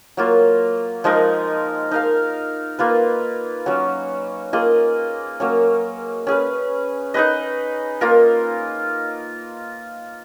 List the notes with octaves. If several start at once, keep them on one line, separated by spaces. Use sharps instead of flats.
F#3 A#3 F4
F3 G#3 D#4 A#4
D#4 A#4 F5
A#3 F4 B4
F#3 C#4 F#4
A#3 F4 G#4 D#5
F#3 A#3 C#4
C#4 G#4 B4
D#4 G#4 B4 D#5
A#3 F4 A#4